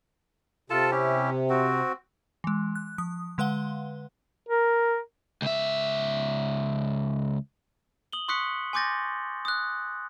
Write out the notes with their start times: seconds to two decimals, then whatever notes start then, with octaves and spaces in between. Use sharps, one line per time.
0.70 C3 F4 A4 A5
0.91 C#4 E4 G4
1.50 C4 F#4
2.44 E3 G#3
2.75 F#6
2.98 F3 D#6
3.38 D3 G#3 B4 F5 F#5 G7
4.48 A#4
5.42 C#2 E5
8.13 D#6 F#7 G7
8.28 C6 C#6 D#6 F#6 B6 C#7
8.73 G#5 C6 D6 G6 A6 A#6
9.45 D#6 F#6